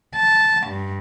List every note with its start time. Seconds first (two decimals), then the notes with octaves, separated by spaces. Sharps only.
0.13 A5
0.67 G2